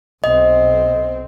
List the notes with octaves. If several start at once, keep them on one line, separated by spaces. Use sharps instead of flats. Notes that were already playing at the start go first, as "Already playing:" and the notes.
B1 C4 D#5